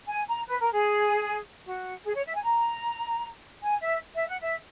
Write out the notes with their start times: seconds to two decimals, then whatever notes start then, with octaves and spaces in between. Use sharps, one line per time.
0.08 G#5
0.28 A#5
0.48 B4
0.61 A#4
0.74 G#4
1.66 F#4
2.04 G#4
2.15 C#5
2.25 E5
2.34 G#5
2.44 A#5
3.62 G#5
3.82 E5
4.15 E5
4.28 F#5
4.41 E5